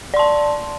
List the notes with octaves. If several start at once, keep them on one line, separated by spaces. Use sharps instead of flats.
D5 A5 C6